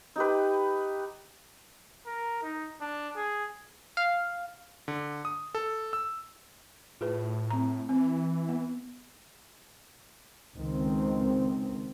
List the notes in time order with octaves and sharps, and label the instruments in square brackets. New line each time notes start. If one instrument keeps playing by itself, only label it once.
[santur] D#4 G4 B4
[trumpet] A#4
D#4
D4
G#4
[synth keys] F5
[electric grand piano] D3
D#6
A4
E6
[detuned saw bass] A2 [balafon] F4 G#4 B4
[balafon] C4 A#5
[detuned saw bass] E3 [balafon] C4
[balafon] B3
[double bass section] C#2 D#3 G#3 C4